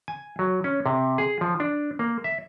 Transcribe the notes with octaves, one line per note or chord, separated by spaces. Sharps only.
G#5
F#3
C#4
C3
G#4
F3
D4
A#3
E5